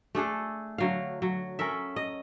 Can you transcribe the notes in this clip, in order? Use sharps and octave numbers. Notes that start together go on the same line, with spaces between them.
A3 D4 G#4 A4
D3 F#3 F5
F#3
C#4 A4 A#4 E5
D#5